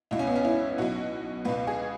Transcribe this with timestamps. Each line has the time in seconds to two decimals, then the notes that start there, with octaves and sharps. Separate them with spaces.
0.11 C#2 B2 E4
0.19 C#4
0.27 B3
0.36 C#4
0.45 E4
0.78 B1 B2 F#4
1.45 C#2 B2 B4
1.67 G#4